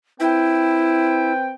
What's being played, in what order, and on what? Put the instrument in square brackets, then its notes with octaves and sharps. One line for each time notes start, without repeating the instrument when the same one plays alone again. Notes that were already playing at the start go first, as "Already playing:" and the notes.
[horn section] C4 B4 G5 [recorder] E4